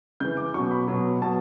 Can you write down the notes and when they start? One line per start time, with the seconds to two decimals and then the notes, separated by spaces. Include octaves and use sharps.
0.20 C#3 E3 G6
0.37 D6
0.54 B2 F#3 C#6
0.71 B5
0.88 B2 F#3
1.22 B2 F#3 A5